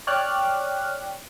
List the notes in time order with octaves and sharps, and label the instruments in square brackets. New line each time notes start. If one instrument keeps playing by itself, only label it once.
[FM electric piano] C#5 D5 G5 F6 F#6